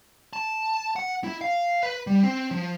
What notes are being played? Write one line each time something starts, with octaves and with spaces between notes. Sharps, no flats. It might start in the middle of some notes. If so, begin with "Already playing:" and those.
A5
F#5
E4
F5
B4
G3
C4
F3